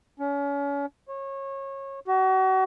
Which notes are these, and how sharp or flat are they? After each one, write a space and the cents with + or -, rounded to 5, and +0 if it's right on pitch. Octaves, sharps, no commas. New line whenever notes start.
C#4 +35
C#5 -25
F#4 +35